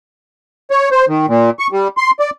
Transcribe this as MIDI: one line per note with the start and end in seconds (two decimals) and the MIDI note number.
0.71 0.89 73
0.91 1.05 72
1.08 1.26 51
1.28 1.50 46
1.59 1.67 85
1.72 1.88 55
1.97 2.11 84
2.20 2.30 74